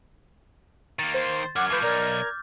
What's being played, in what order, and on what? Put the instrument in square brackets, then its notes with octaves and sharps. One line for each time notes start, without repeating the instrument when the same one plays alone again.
[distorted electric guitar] D#3 A#3 [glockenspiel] A6
[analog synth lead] C5
[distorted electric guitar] F#2 [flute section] F#5 D6 F#6 [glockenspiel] F6 [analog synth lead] G#6
[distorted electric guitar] F3 A3 [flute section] B4 [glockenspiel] D6 G6
[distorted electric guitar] B1 [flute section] A#4 D5